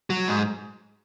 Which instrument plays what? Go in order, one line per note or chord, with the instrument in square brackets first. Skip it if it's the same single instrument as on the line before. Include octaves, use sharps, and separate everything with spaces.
[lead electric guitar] F#3
G#2